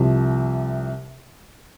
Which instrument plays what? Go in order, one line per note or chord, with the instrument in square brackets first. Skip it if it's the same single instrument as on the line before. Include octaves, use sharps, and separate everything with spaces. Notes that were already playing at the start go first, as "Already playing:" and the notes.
Already playing: [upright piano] C2 C3 F3